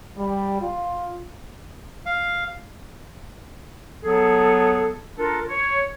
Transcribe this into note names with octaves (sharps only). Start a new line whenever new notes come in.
G3
F4
F5
F#3 B3 G#4 A4
D4 F4 A4 A#4
C#5